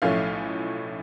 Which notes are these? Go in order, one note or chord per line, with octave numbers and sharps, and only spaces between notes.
B1 A2 F3 A3 C#4 F5